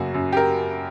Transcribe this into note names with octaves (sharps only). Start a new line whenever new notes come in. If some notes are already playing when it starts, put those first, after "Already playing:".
Already playing: F#2 C#3 A#3 F#4
F#2
G4
A#4